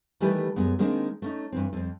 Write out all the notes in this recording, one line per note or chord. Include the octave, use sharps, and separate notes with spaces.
D#3 E3 G3 A3 G4 B4
F#2 G#3 B3
D#3 G#3 A#3 C4 D4 D#4
A3 C#4 D#4
G2 E3 C4
F2 C4